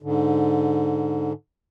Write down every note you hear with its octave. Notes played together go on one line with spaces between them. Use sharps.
G#2 D3